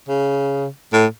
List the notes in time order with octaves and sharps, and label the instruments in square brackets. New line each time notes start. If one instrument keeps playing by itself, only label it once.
[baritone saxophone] C#3
A2